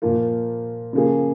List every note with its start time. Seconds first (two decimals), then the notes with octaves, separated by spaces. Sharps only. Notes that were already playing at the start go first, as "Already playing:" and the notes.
0.02 A#2 F3 A#3 F4
0.93 C#3 F3 A#3 F4 G#4